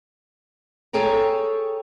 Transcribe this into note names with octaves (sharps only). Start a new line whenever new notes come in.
G#4 A4 C#5 G5 A#5